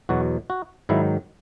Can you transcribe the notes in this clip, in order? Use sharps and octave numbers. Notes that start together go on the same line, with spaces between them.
E2 B2 F#3 F#4
F#4
G#2 D#3 F#3 E4